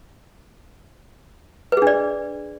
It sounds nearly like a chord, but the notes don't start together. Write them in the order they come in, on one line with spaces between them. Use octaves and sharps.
B4 G#4 D4 D5